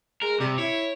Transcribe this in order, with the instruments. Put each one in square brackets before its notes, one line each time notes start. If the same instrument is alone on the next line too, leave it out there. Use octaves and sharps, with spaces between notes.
[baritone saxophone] G#3 [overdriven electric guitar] A#4
[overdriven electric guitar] C3 [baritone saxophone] G3
[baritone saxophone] E4 [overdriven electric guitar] C#5